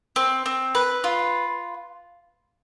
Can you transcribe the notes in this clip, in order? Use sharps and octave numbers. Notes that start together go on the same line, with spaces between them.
C4
C4
B4
F4